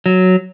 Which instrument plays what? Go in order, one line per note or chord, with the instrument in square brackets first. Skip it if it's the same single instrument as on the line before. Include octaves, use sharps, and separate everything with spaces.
[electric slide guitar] F#3